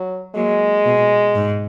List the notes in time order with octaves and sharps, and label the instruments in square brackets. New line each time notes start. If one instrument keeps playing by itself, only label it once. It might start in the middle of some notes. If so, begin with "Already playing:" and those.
Already playing: [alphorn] F#3
[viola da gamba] F#3 A#3 [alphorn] G#3
[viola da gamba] B2
G#2